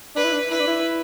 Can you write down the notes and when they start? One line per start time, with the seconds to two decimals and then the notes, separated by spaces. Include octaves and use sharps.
0.16 D4 B4
0.24 E4
0.33 D4
0.50 E4 B4
0.60 D4
0.67 E4